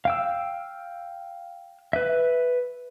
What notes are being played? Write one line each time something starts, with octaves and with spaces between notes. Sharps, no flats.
F5 G5 E6
B4 E5